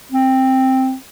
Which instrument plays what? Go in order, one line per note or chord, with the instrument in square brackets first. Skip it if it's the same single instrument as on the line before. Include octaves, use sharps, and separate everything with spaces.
[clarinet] C4